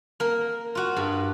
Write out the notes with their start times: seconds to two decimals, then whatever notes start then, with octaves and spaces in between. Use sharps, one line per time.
0.20 A#3 A#4
0.75 F4 F#4
0.96 G2